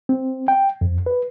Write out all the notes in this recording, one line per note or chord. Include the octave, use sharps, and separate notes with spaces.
C4
G5
F2
B4